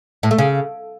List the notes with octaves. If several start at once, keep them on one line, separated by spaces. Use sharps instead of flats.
A2
A3
C#3